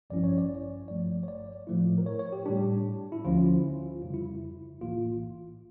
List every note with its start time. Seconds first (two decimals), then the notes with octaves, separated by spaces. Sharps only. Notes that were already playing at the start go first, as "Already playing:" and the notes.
0.10 A1 G2 F3 C#4 E4 D5
0.24 C#5
0.38 D5
0.88 G1 G2 F3 A3 D5
1.23 C#5
1.28 D5
1.67 A2 F3 A3 E4
1.98 A#4
2.06 C#5
2.19 C#5
2.33 G4
2.45 A2 G3 D4 G4
3.12 E4
3.25 D2 D3 F3 C#4 F4
3.64 E4
3.83 F4
4.03 F2 C#3 G3 F4
4.14 E4
4.35 E4
4.81 A#1 A2 E3 A#3 F4